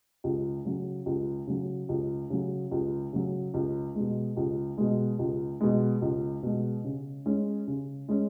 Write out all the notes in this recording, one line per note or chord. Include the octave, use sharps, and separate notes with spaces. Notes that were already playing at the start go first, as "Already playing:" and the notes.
C#2
C#3 F#3
C#2
C#3 F#3
C#2
C#3 F#3
C#2
C#3 F#3
C#2
B2 G#3
C#2
B2 G#3
C#2
B2 G#3
C#2
B2 G#3
C#3
G#3 C#4
C#3
G#3 C#4